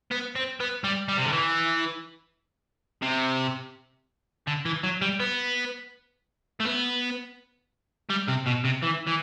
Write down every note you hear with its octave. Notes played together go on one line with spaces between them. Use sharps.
B3
C4
B3
G3
G3
C3
D3
E3
C3
D3
E3
F#3
G3
B3
A3
B3
G3
C3
B2
C3
E3
E3